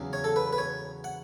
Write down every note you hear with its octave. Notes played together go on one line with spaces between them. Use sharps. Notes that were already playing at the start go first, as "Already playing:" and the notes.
Already playing: E2 C#3 F#3
C#5
A4
B4
B4
C#5
F#5